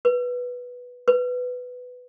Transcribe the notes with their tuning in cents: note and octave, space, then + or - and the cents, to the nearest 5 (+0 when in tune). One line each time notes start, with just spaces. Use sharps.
B4 -5
B4 +10